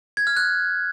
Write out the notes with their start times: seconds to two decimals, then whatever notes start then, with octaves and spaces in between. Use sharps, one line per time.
0.17 G#6
0.27 F6
0.37 F#6